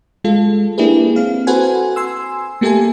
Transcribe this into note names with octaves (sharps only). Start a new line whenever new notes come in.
G#3 F4 A4
A#3 D4 E4 G4 G#4 B4
C4 F5
F#4 A4 B4 C5 F#5 G#5
G#5 C6 E6
A3 A#3 G4 A4 E5 G#5